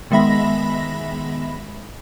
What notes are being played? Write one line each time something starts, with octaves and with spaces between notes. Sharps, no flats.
D#3 G#3 B3 E5 B5 A#6